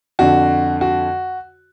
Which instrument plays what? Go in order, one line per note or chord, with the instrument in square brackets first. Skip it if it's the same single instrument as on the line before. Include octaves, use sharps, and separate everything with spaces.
[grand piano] F2 D3 F#4
F#4